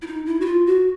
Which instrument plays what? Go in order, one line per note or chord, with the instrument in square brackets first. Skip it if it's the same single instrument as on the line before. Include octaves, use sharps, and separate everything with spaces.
[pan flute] E4
D#4
E4
F#4
F4
F#4